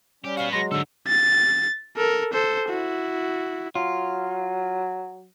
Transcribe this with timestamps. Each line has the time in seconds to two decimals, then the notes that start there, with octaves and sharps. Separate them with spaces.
0.24 G3 C#4 G4
0.37 B3 F#4 F5
0.52 F#3 G#3 C6 A#6
0.71 G#2 D3 A4 E6
1.07 A6
1.97 A4 A#4
2.33 A4 C5
2.69 E4 F#4
3.75 F#3 F4